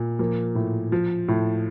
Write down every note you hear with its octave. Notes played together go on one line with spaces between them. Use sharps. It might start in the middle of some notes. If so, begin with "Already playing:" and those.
Already playing: A#2
F3 A#3
A2
F3
A2